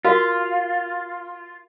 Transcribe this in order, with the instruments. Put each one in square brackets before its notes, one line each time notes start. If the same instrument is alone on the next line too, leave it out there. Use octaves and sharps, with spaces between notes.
[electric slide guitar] F4 [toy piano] F#4 A#4 F5